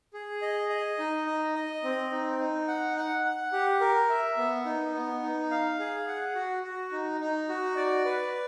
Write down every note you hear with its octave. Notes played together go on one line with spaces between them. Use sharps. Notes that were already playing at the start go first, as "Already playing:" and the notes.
G#4
D#5
D#5
D#4
D#5
D#5
C4
D#4
D#4
F#5
F#5
F#5
G4
A#4
E5
B3
D#4
B3
D#4
F5
G#4
F#5
F#4
F#4
D#4
D#4
F#4
D5
B4